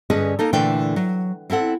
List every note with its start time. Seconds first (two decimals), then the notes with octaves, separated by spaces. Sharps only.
0.10 G2 D3 C#4 G#4 B4 D#5
0.39 A#3 D#4 A4
0.53 A#2 D3 E3 A3 D4 G5
0.96 F#3
1.50 C4 E4 A4 F#5